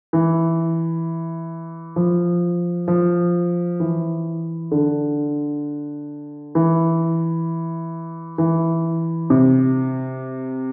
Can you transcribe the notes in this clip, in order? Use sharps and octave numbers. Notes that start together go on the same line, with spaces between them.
E3
F3
F3
E3
D3
E3
E3
C3